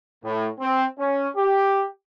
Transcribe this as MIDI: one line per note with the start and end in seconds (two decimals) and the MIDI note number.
0.24 0.48 45
0.60 0.84 60
0.99 1.29 61
1.36 1.85 67